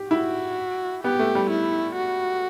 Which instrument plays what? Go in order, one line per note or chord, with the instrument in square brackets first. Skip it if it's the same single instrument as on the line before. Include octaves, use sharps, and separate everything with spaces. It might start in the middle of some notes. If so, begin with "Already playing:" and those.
Already playing: [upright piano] G4
[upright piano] E4 [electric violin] F#4
[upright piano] B3 [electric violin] G4
[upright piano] A3
G3
[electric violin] E4
F#4